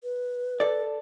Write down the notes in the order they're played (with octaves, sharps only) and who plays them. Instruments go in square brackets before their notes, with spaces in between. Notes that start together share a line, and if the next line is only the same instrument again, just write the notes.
[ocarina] B4
[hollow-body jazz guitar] A4 D5